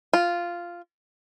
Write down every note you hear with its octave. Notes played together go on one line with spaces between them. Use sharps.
F4